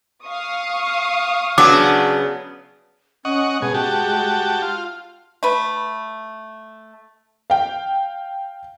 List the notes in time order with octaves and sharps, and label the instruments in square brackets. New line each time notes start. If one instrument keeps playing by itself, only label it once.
[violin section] F5 C#6 D#6
[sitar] C#3 B3 [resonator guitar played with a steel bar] F#3 D4 [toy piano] D6
[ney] C#4 [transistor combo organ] D#5 F#5 C#6
[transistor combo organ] B2 G#4 [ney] G#3
[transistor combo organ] F#4 G4 A5
F4
[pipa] A3 B4
[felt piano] F5 G5